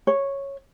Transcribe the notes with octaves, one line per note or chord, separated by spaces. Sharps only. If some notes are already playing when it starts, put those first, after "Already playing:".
C#5